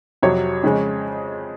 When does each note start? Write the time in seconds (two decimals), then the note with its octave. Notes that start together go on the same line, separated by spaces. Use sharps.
0.22 F2 C3 F#3 C#5
0.63 F2 C#3 G#3